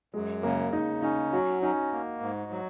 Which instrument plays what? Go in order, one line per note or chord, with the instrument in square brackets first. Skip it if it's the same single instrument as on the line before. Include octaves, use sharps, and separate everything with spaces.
[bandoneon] F#2 [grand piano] G#3
[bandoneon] C#3 [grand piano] A#3
[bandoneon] C#3 [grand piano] D#4
[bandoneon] C#4 [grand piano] D#4
[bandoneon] F#3 [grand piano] F#4
[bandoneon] C#4 [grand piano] D#4
[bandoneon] A#3
G#2
F#3